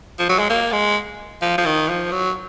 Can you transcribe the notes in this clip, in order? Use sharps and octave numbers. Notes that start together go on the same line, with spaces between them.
F3
F#3
G#3
A#3
G#3
F3
F3
D#3
F3
F#3